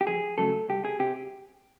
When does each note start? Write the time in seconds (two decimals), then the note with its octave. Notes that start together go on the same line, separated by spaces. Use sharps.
0.01 G4
0.07 F2 G#4
0.38 C#3 F#3 A3 A4
0.69 C2 G4
0.85 G#4
0.99 C3 G4